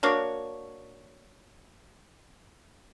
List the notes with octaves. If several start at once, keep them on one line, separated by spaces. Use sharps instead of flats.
A#3 D4 F#4 C#5